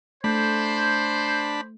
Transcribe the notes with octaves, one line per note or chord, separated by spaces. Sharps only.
A3 D4 C5 B5